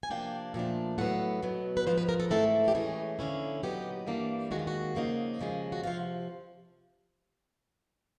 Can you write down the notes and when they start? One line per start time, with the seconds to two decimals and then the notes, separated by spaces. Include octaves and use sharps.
0.03 G#5
0.10 C3 F3 A#3 D4 G5
0.54 A#2 F3 A3 D4
0.98 A2 F#3 B3 F#5
1.42 B2 F#3 B3
1.77 B4
1.86 G#2 F3 G#3 C5
1.98 B4
2.09 A#4
2.20 A4
2.30 G#2 E3 A3 C4 E4 A4
2.68 G4
2.75 A2 E3 G#3 C#4 G#4
3.19 D3 F3 A#3 C#4 E4
3.63 A#2 F#3 B3 D#4 G4
4.06 G2 E3 G3 A#3 D4
4.51 D#2 D#3 G#3 F#4
4.59 F4
4.67 F#4
4.95 C#3 F3 A#3 D#4
5.39 D#2 C#3 F3 G#3
5.72 F#4
5.83 C3 F3 F4